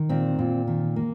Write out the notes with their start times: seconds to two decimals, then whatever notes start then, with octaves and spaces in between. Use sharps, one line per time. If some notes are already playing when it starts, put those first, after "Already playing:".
Already playing: D#3
0.09 A#2 C4
0.39 A#2
0.68 D#3
0.96 A#3